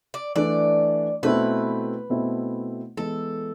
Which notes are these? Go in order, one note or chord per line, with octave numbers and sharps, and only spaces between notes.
D5
E3 A3 D4 D5
B2 A3 C4 E4 B4
B2 A3 C4 E4
E3 G#3 B3 A4